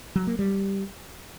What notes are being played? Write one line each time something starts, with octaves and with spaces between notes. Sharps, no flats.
F#3
A#3
G3